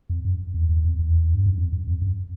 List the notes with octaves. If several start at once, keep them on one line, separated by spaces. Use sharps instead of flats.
F2
F#2
E2
E2
F2
E2
G2
F#2
F2
F#2
F2
F#2